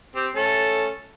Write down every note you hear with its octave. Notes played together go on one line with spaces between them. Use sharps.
C4 G4
A3 C#4 A4